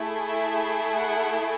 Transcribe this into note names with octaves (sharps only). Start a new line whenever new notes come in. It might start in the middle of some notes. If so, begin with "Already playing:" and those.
Already playing: A3 E4 G#4
E5
F#5